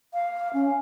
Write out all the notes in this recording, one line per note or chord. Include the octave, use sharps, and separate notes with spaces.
F5
C#4